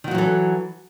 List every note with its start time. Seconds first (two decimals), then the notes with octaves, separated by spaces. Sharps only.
0.04 D#3
0.08 F#4
0.11 F#3
0.15 E3
0.18 A4